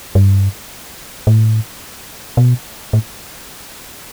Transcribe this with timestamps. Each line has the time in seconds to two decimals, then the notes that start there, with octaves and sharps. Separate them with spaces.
0.15 G2
1.27 A2
2.37 B2
2.93 A2